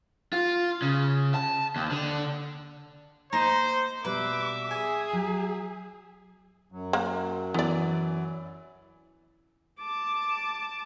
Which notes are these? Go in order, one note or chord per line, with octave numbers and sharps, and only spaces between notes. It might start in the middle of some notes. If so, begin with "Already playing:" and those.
F4
C#3
A5
D#2
D3
A#3 D#4 C5
B2 G3 B4 E5 D6
G#4 G#5
F#3
F#2 F#3
A#3 C#5 F#5
E3 B3 D5
A5 D6